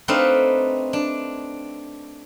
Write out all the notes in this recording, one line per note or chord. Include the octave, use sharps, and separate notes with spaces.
A3 C4 D4 D#4 B4 F5
D4